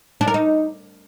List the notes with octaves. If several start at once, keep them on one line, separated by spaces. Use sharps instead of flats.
D4
A#4
D#4